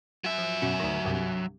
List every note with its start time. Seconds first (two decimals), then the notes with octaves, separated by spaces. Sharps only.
0.24 F#3 E5
0.38 F3
0.62 F#2 B2 C#4
0.80 D2 D#3
1.05 C2 G2 C3